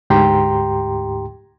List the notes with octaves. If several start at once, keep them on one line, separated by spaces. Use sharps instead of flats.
D2 G#2 G4 G5 A#5 C6